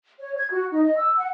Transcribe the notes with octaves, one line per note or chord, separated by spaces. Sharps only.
C#5
G#6
F#4
D#4
D#5
E6
F#5